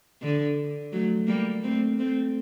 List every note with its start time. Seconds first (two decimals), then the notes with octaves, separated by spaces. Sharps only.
0.22 D3
0.92 F#3 A3
1.27 G3 A#3
1.63 A3 C4
1.99 A3 C4